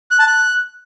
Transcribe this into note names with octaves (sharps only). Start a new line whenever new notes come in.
F#6
A5
F#6